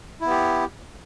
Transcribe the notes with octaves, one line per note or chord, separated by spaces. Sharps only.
B3 E4 G4